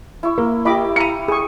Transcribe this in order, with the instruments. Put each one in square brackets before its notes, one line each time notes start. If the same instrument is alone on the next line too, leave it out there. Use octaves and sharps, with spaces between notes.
[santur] E4 C#6
[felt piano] A#3
[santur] E4 G4 G5 [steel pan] D#5 B5 D6
[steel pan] F5 A#5 B5 [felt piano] C#7 D#7
[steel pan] G#4 C#6